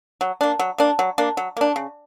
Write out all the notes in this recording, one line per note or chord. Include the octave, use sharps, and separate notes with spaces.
F#3
A#3 D4
F#3
A#3 D4
F#3
A#3 D4
F#3
A#3 D4
C#3